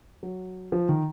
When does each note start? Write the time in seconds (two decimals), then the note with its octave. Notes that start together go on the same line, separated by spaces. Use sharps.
0.23 F#3
0.72 F3
0.89 D#3